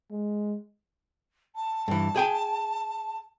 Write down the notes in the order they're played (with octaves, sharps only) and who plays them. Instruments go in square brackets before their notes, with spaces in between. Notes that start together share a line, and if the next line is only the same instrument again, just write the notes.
[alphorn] G#3
[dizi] A5
[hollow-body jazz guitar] G2 E3
G#4 G5 G#5